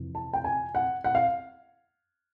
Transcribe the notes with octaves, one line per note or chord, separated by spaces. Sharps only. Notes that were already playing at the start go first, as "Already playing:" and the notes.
Already playing: F2 C3 E3
A5
G5
G#5
F#5
F#5
F5